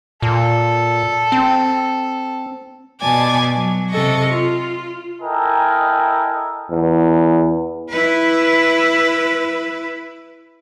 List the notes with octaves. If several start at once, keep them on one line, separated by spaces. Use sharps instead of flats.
A#2 A4
C4
B2 D5 G#5 A5
F#3
C3 A4 D#5 C#6
F4
E4 A4 A#4 D#5 G5 G#5
E2
E4 B4